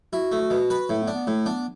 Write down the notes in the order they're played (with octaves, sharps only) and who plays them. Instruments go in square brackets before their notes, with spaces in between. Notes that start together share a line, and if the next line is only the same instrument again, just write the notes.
[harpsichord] E4 [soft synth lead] F#4
[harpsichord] A3
B2
B4
[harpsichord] A2 [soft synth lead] E4
[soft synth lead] B3
[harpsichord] D4
[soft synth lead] B3
[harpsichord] A2 [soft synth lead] A3
[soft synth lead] B3 [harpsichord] D4